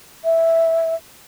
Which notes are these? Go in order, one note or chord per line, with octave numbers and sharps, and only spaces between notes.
E5